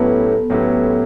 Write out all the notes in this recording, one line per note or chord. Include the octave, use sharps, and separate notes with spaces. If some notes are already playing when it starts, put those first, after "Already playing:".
Already playing: A2 F#3 B3 C#4 E4 G4 A4 B4
A2 F#3 C#4 E4 G4